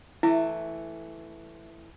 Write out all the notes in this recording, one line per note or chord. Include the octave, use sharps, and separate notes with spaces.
E3 A3 E4